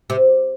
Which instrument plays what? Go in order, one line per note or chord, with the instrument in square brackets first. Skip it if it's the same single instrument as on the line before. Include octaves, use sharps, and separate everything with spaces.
[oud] C3